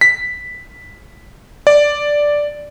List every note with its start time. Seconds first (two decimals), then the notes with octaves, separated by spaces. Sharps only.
0.01 B6
1.67 D5